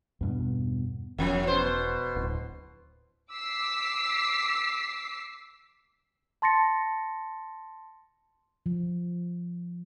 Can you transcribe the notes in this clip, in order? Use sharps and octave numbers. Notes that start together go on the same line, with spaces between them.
E2 G2 B2
E1 F#2 F3
B2 C5
D1
D6 E6 B6 C7
A5 C6 A6 A#6 C#7
F3